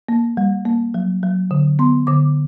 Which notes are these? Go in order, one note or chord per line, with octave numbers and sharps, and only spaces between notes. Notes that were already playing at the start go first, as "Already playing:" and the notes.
A#3
G3
A#3
F#3
F#3
D3
B3 C6
D3 D6